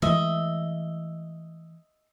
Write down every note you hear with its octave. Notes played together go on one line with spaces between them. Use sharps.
E3 G#3 A3 D#5 E5